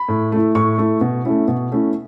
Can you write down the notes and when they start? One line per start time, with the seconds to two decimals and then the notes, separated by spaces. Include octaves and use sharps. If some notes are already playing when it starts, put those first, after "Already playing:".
Already playing: B5
0.08 A2
0.32 A3 E4
0.55 A2 C#6
0.78 A3 E4
1.01 B2
1.25 A3 C#4 E4
1.48 B2
1.72 A3 C#4 E4